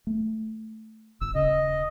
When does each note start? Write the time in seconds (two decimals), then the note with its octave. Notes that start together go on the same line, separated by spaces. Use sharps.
0.07 A3
1.21 G1 E6
1.35 D#1 C#3 D#5